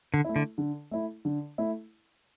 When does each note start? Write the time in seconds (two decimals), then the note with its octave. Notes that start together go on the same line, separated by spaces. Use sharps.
0.14 D3
0.25 A3 E4
0.36 D3
0.58 D3
0.91 A3 E4
1.25 D3
1.58 A3 E4